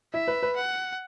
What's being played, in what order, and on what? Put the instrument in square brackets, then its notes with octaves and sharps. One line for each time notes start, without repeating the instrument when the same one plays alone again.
[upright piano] E4 [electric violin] E5
[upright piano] B4
B4
[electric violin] F#5